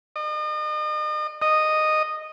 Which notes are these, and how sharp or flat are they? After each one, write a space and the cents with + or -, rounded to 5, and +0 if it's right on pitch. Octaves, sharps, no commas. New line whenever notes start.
D#5 -40
D#5 -10